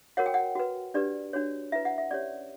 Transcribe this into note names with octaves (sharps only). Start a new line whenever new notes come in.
F#4 A#4 C#5 F#5
G5
F#5
F#4 B4
D4 G4 B4 D5
D4 F#4 C#5
E4 B4 E5
F#5
E5
C#4 G4 C#5 D5